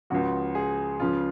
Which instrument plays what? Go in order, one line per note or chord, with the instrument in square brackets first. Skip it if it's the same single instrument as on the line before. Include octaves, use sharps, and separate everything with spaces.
[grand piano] C#2 C#3 F3 F#4
G#4
C#2 C#3 F3 F4